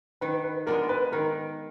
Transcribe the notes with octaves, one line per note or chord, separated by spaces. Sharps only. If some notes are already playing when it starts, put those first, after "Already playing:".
D#3 B4
B4
G#3 B3 D4 A#4
B4
D#3 A#4